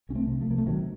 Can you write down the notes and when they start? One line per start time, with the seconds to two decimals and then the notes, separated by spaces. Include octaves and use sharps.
0.09 C2 C#4
0.15 A3 C4
0.27 C3
0.40 F3 A3
0.47 C2 A#3
0.58 A3
0.67 C3 D#3 F#3